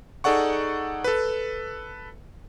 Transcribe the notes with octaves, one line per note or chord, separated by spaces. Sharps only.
D#4 G#4 A4 D5 F#5 C#6
A4 B4